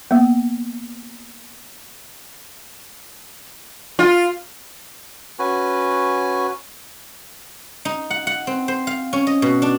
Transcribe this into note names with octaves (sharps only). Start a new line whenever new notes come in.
A#3 B3
F4
C#4 F#4 B4 G#5
D#4
F#5
F#5
C4
C5
F5
C#4
D#5
B2
D4